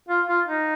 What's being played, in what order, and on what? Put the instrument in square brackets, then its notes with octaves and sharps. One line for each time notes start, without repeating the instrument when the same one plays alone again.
[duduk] F4
F4
D#4